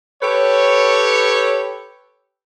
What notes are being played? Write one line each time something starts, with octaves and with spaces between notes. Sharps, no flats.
G4 A4 B4 C#5